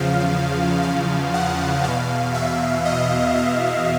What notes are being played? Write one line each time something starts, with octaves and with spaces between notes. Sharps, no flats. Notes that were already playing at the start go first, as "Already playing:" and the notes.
Already playing: E2 C#3 F3 F5
F5
F#5
E2 B2 F5
E5
D#5
D#5